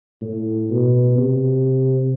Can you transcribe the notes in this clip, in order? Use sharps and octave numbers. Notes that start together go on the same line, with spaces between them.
A2
B2
C3